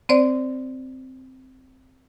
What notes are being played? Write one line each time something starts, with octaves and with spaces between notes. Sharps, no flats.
C4 C5 D5